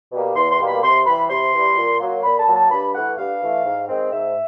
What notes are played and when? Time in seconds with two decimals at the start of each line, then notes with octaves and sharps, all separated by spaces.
0.12 B2 G3 A#3
0.35 E2 C6
0.51 C6
0.59 B2 G3 A#3
0.67 B5
0.82 C3 C6
1.06 E3 G3 B5
1.29 C3 C6
1.53 E3 G3
1.77 A#2
2.00 F#3 A#3
2.23 A#2 B5
2.39 A5
2.48 F#3 A#3
2.55 A5
2.71 G2 B5
2.94 E3 A3 F#5
3.18 G2 F5
3.41 E3 A3
3.65 G#2
3.88 D#3 G#3 C4
4.12 G#2 E5